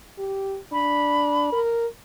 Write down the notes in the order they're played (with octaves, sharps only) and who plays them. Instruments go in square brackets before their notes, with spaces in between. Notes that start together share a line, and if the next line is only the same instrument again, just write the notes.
[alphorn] G4
[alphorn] D4 [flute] B5
[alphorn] A#4